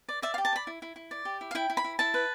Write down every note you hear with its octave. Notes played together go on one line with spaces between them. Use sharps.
D5
D5 E5
F5
G4
A5
D5 B5
E4
E4
E4
D5
G4
E4
F5
E4 G5
E4
B5
E4
E4 A5
B4